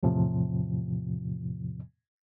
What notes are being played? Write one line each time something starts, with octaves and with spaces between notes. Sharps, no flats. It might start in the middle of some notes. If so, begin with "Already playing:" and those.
E2 A2 C3 F3